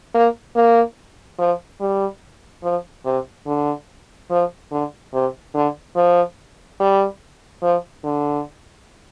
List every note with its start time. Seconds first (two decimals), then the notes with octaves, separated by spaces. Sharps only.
0.14 A#3
0.56 A#3
1.39 F3
1.80 G3
2.63 F3
3.05 C3
3.46 D3
4.30 F3
4.71 D3
5.13 C3
5.54 D3
5.96 F3
6.80 G3
7.62 F3
8.04 D3